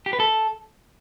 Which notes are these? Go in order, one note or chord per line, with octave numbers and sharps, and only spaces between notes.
G4
B4
A4